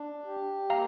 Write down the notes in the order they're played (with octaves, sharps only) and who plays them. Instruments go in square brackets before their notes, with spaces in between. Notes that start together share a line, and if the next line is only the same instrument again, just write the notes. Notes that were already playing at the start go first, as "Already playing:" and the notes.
Already playing: [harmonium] D4
G4
[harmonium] A#3 [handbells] F5 A#5